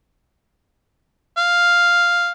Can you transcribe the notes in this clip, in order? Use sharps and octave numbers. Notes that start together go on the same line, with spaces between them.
F5